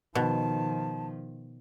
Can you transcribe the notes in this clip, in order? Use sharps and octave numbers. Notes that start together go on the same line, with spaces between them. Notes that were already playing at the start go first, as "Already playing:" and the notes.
B2 D#3 F3 A5